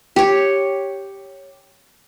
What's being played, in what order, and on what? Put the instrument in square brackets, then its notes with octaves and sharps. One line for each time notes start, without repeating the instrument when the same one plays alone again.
[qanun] G4 C#5